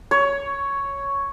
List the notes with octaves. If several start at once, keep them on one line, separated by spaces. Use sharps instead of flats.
C#5